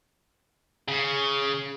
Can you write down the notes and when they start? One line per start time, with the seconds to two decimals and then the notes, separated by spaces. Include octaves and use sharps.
0.88 C#3